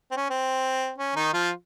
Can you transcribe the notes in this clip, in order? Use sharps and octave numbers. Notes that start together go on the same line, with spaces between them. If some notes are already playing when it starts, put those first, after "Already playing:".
C4
C#4
C4
C#4
D#3 D#4
F3 F4